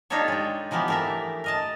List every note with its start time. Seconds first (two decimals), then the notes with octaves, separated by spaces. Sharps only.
0.10 D4 D#4 F4 G4 A4 C#5
0.28 G#3 G5
0.71 E3 F3 A#3 B3 G4
0.88 A3 A#4 E5
1.44 A#4 D#5 A5